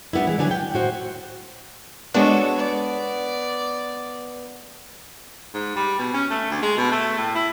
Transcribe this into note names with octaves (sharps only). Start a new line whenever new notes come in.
G3 B3 D4 E4
E3 G#3
D3 F#3 D4 E4 B4 G#5
G5
A2 F#4 C5
G#3 B3 D4 F#4 A4 C#5
D5
G#2
G3
B2
C#4
A3
D2
G#3
B2
A3
A2
E4